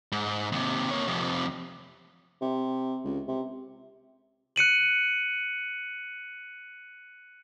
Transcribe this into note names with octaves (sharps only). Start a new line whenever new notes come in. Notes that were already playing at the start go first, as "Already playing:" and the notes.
G#2
D#2 C3
A#3 C#5
F2 C3
C3
C#2
C3
F#6 C#7 D#7 F#7